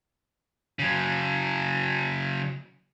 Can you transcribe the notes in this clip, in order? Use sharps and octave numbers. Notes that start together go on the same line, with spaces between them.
C#3 F#3